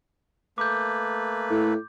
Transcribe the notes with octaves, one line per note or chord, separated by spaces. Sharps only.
A3 A#3 B4 D6 G6
A2